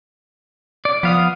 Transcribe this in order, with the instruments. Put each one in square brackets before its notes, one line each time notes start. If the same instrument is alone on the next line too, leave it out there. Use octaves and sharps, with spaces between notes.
[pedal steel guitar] D5
[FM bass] F3 [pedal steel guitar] B3 F5 D#6